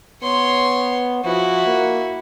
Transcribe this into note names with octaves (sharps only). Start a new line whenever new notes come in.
B3 C#5 C6
F3 E4 F#4
A#3